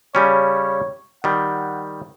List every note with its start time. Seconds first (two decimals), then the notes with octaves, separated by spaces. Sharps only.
0.15 C#3 G3 C#4 C#5
1.24 D#3 G3 F#5